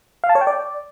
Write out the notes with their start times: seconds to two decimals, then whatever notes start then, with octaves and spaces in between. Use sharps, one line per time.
0.24 F5
0.29 A5
0.35 C#5
0.41 G5
0.47 D5